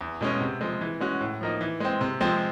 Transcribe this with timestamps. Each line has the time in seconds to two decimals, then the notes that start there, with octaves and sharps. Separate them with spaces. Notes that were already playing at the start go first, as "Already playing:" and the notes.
0.01 E2
0.21 B2 G#3 C#4
0.41 C3
0.61 F3 G#3
0.81 E3
1.00 G#3 C#4 F#4
1.21 A2
1.41 F3 A#3 D#4
1.61 E3
1.80 G#3 C4
2.01 C3
2.21 F3 G#3 C4